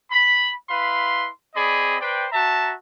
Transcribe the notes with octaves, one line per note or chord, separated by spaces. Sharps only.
B5
E4 B4 F5 B5 C6
C4 G#4 D5 D#5 B5
B4 C5 D5 G5
F#4 E5 A5 A#5